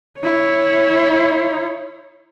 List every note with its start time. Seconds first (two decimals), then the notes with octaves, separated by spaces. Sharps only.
0.20 E4 C#5